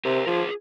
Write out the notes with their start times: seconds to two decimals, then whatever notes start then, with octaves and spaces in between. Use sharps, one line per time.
0.05 C3 G4 A#4
0.27 F3 F4 G#4